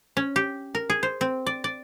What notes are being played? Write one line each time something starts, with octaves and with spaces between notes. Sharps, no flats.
C#4
G4
A#4
G#4
C5
C4
D5
D5